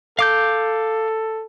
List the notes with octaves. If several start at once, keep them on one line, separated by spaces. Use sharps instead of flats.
A4 F5 D6 G6